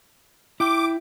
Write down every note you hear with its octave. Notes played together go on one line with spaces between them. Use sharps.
E4 G5 D6